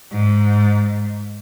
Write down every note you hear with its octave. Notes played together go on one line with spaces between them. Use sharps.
G#2